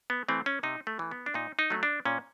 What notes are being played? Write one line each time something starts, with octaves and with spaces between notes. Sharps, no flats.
B3
E3 A3 C4
C#4
C3 D#4
A3
E3 A3
B3
D4
A#2 D#4
D#4
F#3 A3
D4
A#2 C#4